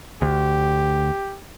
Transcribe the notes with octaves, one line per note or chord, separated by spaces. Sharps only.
D2 G4